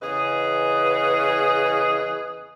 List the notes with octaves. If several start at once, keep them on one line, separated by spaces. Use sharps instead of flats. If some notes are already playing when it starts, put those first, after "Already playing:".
E2 C#3 G#4 B4 D#5